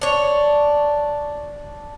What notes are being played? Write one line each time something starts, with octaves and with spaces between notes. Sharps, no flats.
D4 C#5